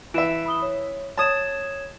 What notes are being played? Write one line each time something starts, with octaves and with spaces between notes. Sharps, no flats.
E3 E5 D7 E7
B5 D#6 G7
C#5
C#5 A5 D#6 G#6 E7